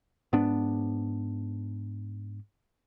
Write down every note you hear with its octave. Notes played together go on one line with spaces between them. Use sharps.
G#2 B3 D4